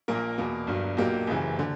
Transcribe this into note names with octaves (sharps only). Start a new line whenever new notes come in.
A#1 A#2 A#3 A#4
E2 B2 A#3
G1 G2 F#3
B1 A#2 F#3 A#3 G4
F#1 F#2 C#3 E3
D3